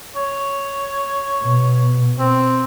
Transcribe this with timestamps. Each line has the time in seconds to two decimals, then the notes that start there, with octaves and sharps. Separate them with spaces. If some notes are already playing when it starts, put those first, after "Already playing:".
0.16 C#5
1.43 B2
2.19 C4